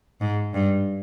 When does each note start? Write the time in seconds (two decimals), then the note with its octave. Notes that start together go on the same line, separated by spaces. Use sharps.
0.21 G#2
0.54 G2